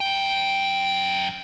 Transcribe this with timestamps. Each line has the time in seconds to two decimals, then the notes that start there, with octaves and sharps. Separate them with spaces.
0.01 F#2 G5